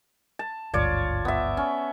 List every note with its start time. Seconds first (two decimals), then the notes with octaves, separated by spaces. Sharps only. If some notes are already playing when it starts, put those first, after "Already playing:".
0.39 A5
0.73 G#1 D2 G2 F4 C#5 D5
1.25 B3 E5
1.57 C#4